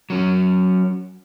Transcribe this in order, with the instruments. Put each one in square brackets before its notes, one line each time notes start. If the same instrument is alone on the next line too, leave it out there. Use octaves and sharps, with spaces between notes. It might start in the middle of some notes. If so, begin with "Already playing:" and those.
[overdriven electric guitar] F#3 C#4